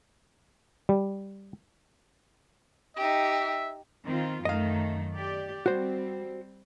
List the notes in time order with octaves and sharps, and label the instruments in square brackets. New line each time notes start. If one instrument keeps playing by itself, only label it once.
[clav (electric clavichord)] G3
[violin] D#4 G4 [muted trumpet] E5
[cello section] D#3 C4 F4
[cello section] F#2 D#3 A3 [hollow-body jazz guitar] D#5 F5
[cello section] G4 D5
[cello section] G3 C4 [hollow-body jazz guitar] F#4 C5